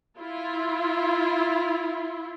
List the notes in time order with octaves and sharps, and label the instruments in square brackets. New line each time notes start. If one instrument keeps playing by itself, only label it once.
[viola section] E4 F4